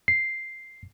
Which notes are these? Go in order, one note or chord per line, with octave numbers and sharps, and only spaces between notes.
C7